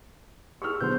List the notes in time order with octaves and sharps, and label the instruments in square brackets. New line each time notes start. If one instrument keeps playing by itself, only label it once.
[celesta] G4 G#4 [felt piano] C#6 E6 F6
[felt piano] B2 D3 F#3 [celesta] B4 C5 [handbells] C6 G6